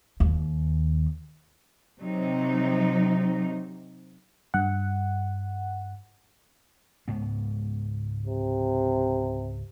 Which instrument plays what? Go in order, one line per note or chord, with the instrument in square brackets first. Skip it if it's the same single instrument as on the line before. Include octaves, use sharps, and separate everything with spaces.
[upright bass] D#2
[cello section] C3 F#3 D#4
[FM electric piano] G2 F#5
[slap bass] C#2 G#2 B3
[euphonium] C3